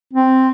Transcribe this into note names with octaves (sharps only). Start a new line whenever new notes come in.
C4